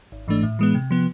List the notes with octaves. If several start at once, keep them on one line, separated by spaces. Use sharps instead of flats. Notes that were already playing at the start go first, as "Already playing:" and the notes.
G#1
G#2 E3 A3 D4
A2
E3 G#3 B3
C3
F3 B3